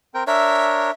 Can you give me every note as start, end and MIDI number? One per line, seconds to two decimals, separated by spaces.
0.14 0.24 60
0.14 0.24 70
0.14 0.24 79
0.27 0.91 62
0.27 0.91 70
0.27 0.91 73
0.27 0.93 76